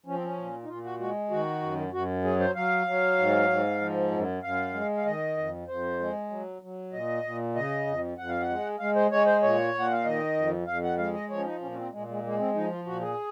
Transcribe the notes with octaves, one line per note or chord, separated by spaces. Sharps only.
F3 C#4
C4
C#4
A#2
D#4
A#2 F4
F#4
G#3 F#4
D#3 F#4
F#2
F#2 F#4
F#3 G#4
C5
F#3 F5
F#3
G#2
G#2
F3
F#2
F#2 F5
G#3
F5
D#3 D#5
F2
F2 C5
G#3
F#3
F#3
A#2 D#5
A#2
C#3 D#5
F2
F2 F#5
F5
F#5
G#3
G#3 F5
C5
G#3 C#5
C5
A#2 C#5
A#2 F#5
F5
D#3 D#5
F2
F2 F5
F#5
G#3 F5
D#5
F3 C#5
C#4
D#4
A#2 C#4
C#4
C4
A#2 G#3
G#3
G#3 A#3
C4
F3 D#4
F4
A#2 F#4
G#4